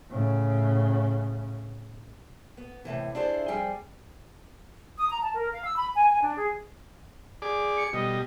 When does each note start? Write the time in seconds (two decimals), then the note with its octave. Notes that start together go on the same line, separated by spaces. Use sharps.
0.10 A2 C#3
2.57 B3
2.85 A2 C3 E3
3.15 D4 E4 F4 G#4 C5
3.48 F2 G3 G#4 G5
4.97 D#6
5.09 A#5
5.21 A5
5.33 A#4
5.52 F5
5.64 E6
5.77 B5
5.95 G#5
6.10 G#5
6.22 D4
6.37 G#4
7.42 G#4 D5 D6
7.77 C#7
7.93 B2 G3 D#5